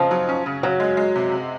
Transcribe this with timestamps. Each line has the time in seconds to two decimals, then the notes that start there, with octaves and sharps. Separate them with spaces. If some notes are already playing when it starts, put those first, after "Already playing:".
Already playing: C#3 F3 C4 D#4
0.11 F#3
0.29 C#4
0.46 C#3
0.63 C#3 F#3
0.80 G#3
0.97 G#3
1.16 C3
1.32 C3